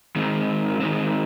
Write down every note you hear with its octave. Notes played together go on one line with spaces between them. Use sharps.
D#3 G#3 C4
D#3 G#3 C4